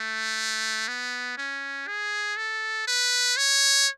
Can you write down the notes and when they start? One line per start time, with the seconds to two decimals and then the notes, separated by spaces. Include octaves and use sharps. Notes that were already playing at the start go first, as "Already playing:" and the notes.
Already playing: A3
0.88 B3
1.37 C#4
1.87 G#4
2.37 A4
2.87 B4
3.37 C#5